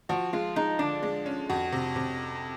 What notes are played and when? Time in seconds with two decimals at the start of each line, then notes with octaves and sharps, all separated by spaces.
0.09 F3 F#4
0.33 G#3 F4
0.56 G#3 D#4
0.79 D3 D4
1.03 G#3
1.26 C#4
1.50 F2 F#4
1.72 C3
1.96 C3